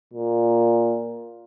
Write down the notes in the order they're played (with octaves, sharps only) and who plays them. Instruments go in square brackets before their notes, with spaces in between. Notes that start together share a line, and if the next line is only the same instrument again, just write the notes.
[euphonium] A#2